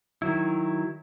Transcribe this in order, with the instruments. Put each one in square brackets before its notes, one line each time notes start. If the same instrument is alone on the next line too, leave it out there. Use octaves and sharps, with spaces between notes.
[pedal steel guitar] D#3 F#3 E4